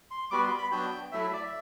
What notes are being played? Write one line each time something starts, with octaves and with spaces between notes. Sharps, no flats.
C6
G3 B3 F#4 D6
C6
B5
F#3 B3 D4 F#4 G5
F#3 A3 E4 E5
E5
D5
E5